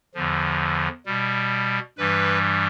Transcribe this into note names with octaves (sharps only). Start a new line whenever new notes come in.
E2 D3 F3
B2 G3
G2 E3 G3 B4